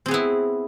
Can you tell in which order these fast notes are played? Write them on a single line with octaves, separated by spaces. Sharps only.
C4 G#4 B3 E4